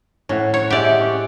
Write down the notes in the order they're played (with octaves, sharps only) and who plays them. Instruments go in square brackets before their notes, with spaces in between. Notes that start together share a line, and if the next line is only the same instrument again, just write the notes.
[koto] A2 [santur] C#4 F#5
[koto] C#5
[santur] G#3 E5 F#5 [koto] G4 D5
[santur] C#4